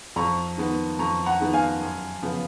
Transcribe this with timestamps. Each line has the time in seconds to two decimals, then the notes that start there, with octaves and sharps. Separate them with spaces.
0.16 F2 A#5 C#6
0.57 D#3 G#3 B3
0.99 F2 A#5 C#6
1.26 F#5 A#5
1.40 D#3 G#3 B3
1.54 F5 G#5
1.81 F#2
2.22 C#3 F3 B3